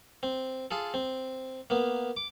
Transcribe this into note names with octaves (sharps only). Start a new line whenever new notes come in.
C4
F4 G#4 A4
C4
A#3 B3
D6